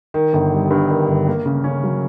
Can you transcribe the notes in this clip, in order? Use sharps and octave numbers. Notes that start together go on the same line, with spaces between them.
D#3
G1
G3
G2
D#3
G1
A#3
C#3
C#4
F#3